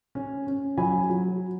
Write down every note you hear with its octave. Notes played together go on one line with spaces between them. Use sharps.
C#4
C#4
F#3 G#5 B5
F#3